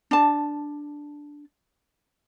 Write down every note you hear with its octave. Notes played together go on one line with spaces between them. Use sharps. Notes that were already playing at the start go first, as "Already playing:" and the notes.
D4 A5